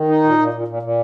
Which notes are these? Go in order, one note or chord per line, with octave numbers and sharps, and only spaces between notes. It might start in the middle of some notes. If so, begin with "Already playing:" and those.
Already playing: D#3
D#4
A#2
A#2
A#2
A#2
A#2